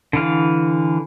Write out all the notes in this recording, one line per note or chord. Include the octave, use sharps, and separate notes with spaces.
D3 E3 F5